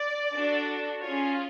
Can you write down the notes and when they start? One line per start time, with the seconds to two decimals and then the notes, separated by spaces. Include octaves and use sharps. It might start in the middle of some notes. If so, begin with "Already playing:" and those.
Already playing: D5
0.35 D4 F#4 A4
1.03 C#4 F4 G#4 C#5